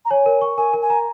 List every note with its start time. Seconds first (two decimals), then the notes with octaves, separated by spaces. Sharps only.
0.05 A#5
0.11 C#5 G#5
0.26 A#4
0.41 C#6
0.58 A#4 G#5
0.74 A#4
0.82 G#5
0.90 A#5